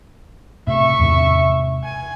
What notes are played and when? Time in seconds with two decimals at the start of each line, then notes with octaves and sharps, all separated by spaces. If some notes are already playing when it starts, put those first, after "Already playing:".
0.67 A2 C3 E5 C#6
0.99 E2 G#2 C3
1.84 G#5